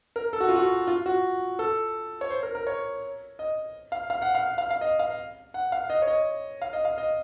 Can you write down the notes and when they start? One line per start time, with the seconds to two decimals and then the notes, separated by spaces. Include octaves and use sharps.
0.16 A#4
0.33 A4
0.40 F#4
0.48 F4
0.56 F#4
0.87 F4
1.06 F#4
1.59 A4
2.21 C#5
2.30 C5
2.43 A#4
2.55 A#4
2.67 C#5
3.39 D#5
3.92 F5
4.10 F5
4.22 F#5
4.35 F5
4.58 F5
4.71 F5
4.81 D#5
4.99 F5
5.54 F#5
5.72 F5
5.90 D#5
6.02 C#5
6.07 D#5
6.62 F5
6.73 D#5
6.85 F5
6.98 D#5